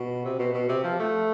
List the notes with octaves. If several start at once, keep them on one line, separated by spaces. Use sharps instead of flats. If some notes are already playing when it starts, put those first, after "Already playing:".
Already playing: B2
C3
B2
B2
C3
F3
A3